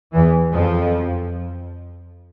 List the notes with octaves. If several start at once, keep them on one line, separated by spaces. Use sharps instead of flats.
E2 E3
F2 F3